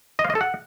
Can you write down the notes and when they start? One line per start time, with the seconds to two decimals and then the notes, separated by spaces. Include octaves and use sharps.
0.19 D#5
0.24 F5
0.30 D#5
0.35 A4
0.41 F#5